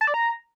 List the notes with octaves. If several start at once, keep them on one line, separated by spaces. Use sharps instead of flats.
A5
D5
A#5